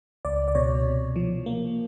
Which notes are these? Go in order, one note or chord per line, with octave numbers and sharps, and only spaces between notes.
C#2 D5
D5
B2 C#5
C3
F3
A#3